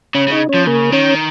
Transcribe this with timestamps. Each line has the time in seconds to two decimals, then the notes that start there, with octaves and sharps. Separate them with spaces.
0.14 C#3 C#4 C#5
0.28 C#3 D#4 D#5
0.49 F3 C#4 C#5
0.66 C#3 A#3 A#4
0.92 D#3 C#4 C#5